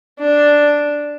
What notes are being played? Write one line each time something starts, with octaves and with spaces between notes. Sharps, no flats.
D4